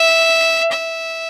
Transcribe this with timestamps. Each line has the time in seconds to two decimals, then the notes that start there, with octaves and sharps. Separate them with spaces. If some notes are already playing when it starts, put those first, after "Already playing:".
Already playing: E5
0.71 E5